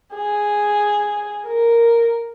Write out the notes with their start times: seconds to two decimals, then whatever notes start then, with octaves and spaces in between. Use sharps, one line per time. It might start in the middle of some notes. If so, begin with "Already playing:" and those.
0.14 G#4
1.47 A#4